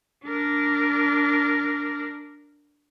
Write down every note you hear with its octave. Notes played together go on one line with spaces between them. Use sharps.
D4 A#4